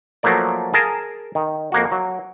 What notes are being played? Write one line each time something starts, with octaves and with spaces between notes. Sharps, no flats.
F3 F#3 A3 A#3 D5
G#4 A#4 A5
D#3
F2 A#3 F#4
F#3